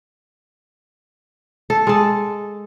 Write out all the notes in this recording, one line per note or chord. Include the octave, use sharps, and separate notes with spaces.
A4
G#3 A4